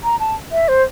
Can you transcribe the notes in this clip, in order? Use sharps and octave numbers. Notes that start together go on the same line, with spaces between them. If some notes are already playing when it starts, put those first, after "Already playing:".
A#5
A5
E5
C5